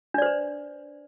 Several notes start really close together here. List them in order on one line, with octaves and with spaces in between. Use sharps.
D4 D5 C5 B4